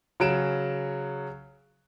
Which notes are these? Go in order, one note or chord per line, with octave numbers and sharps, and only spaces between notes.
C#3 F#3 D7 E7